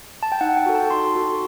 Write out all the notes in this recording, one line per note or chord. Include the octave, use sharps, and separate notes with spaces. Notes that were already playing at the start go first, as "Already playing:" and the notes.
A5
G5
D#4 F#5
G5
F#4 A4
A5
D#4 C6
F#4 A4